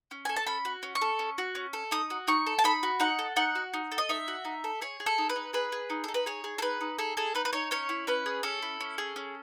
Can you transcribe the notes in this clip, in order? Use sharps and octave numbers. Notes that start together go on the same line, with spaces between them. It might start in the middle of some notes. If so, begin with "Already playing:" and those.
C#4
A4 G#5
A5
C#4 B5
F#4
C#4
C#6
A4
C#4
F#4
C#4
A4
D#4 D#6
F#4
D#4 C#6
A4
A5
D#4 B5
F#4
D#4 F#5
A4
D#4 F#5
F#4
D#4
A4
D#5
D#4 E5
F#4
D#4
A4
G#4 C#5
G#4
A4
D#4
B4
D#4
G#4 B4
G#4
D#4
D#4 A4
B4
G#4 C#5
G#4
A4
D#4 B4
D#4
G#4 A4
G#4 A4
D#4 B4
B4
D#4 C#5
C#4 C#5
E4
C#4 B4
G#4
C#4 A4
E4
C#4
G#4
C#4